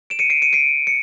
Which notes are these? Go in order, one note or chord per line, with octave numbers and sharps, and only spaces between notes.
D7 E7
C#7 D#7
C7 D7
C#7 D#7
C7 D7
C#7